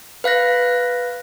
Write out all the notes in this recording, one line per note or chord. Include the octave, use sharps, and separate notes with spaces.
B4 F5 F#6 A#6